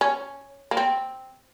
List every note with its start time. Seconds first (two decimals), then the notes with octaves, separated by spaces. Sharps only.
0.01 C#4
0.71 A#3
0.77 C4